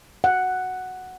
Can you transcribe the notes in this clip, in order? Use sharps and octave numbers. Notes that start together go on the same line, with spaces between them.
F#5